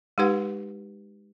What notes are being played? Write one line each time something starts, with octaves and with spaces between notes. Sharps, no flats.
G#3 D#4 G4 B4 F#5